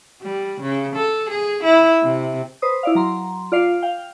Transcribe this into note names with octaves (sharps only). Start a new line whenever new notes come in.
G3
C#3
A4
G#4
E4
C3
B4 C5 D#6
E4 D5 F5
F#3 A#5 C6
F4 D5 F5 C7
F5 G5